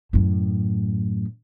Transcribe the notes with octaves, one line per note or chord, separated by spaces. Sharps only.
F#2 A2